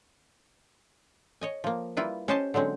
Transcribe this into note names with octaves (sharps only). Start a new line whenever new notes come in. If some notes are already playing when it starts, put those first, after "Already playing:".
C#5 D#5 G#5
F3 A#3
G3 A#3 E4 F4 B4
C#4 G4 C5 D#5 G#5 A5
D3 F#3 G#3 C4 C#4